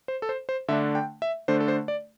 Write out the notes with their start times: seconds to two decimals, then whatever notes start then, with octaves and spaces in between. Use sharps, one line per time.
0.08 C5
0.22 A4
0.29 C5
0.49 C5
0.68 D3 A3 D4 E5
0.95 G5
1.22 E5
1.48 D3 A3 D4 C5
1.60 A4
1.68 C5
1.88 D5